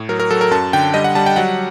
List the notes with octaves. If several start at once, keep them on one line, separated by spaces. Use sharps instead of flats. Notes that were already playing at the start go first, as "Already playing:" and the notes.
Already playing: A2
F#3 A#4
A#4
F#3 A4
A#4
F#2 A5
D3 G5
G3 D#5
F#5
G3 A5
G5
F#3 F#5